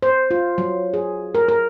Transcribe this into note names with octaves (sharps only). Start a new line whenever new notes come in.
C5
F4
F#3
G#4
A#4
A#4